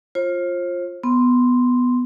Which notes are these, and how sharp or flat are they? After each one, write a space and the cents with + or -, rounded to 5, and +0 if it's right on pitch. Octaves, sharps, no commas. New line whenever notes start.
F4 +0 C5 +40
B3 +0 C6 +0